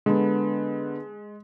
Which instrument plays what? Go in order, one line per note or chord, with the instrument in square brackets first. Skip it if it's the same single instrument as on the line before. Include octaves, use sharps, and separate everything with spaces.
[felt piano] D3 B3 [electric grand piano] G#3